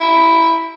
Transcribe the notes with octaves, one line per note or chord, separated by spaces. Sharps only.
E4